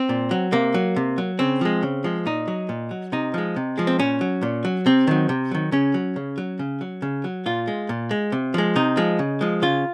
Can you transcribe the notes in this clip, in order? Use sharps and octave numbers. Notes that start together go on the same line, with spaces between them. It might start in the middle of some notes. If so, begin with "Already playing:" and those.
Already playing: C4
A#2
F#3
C3 A#3
F#3
C3
F#3
C#3 C4
F3 G#3
C#3
F3 G#3
A#2 D#4
F#3
A#2
F#3
C3 D#4
F3 G#3
C3
F3 G#3
C4
A#2 C#4
F#3
A#2
F#3
C3 C4
D#3 F#3
C3
D#3 F#3
C#3 C#4
F#3
C#3
F#3
C#3
F#3
C#3
F#3
A#2 F4
G#3
A#2
G#3
C3
F3 G#3
C3 D#4
F3 G#3
C#3
F3 G#3
C#3 F4